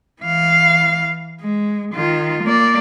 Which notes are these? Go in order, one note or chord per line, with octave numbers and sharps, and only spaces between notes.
E3 F5
G#3
D#3 F4
A#3 D5